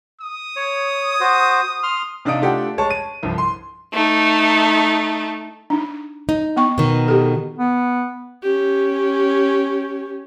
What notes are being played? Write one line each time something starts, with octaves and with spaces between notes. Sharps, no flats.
D#6
C#5
F#4 C5
C6 F6
C3 D4 D#4 F5 D#6 D7
A3 D4 F4 G4 F#5 G5
G#3 C#5 A5 C#6
D#7
C2 G2 F3
C6
A3 D#4
D4 D#4
D#4
B3 G5 C#6
B2 D#3
G4 A4
B3
C#4 G4